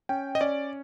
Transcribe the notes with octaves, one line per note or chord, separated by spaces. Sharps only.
C#4 G5
D#5
C#4 D5